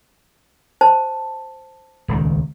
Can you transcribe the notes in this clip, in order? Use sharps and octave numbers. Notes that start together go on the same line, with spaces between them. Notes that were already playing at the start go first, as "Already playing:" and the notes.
C5 A5
D#1 C#2 D#3